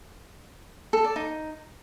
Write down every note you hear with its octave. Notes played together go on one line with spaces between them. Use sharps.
A4
D5
D#4